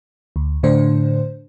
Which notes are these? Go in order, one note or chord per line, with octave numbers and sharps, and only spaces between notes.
D2
A2 D3 D4 C5